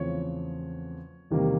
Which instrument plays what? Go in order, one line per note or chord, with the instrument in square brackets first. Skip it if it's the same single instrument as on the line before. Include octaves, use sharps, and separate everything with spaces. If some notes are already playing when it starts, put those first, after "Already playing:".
Already playing: [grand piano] E2 C#3 F3 A3 C4 C#5
E2 C3 D#3 G3 A#3